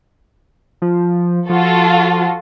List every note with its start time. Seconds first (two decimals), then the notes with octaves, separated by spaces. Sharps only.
0.82 F3
1.49 F3 F4 F#4 A4